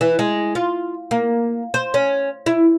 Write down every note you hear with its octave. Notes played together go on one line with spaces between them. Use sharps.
E3
G#3
F4
A#3
C5
C#4
E4